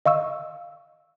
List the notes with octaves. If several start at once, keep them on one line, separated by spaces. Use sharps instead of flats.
D#5 F5 C#6 E6